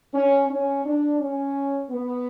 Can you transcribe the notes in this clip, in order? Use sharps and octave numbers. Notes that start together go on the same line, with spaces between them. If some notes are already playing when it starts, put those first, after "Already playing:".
C#4
C#4
D4
C#4
B3